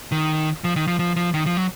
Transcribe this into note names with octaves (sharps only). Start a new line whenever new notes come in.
D#3
F3
D#3
F3
F3
F3
D#3
F3
F#3